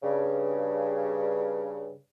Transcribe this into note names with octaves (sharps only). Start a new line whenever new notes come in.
G2 C#3